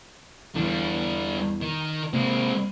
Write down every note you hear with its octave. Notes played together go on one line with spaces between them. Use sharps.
E2 D3 E3 G3
D#3
C3 G#3 A#3 C4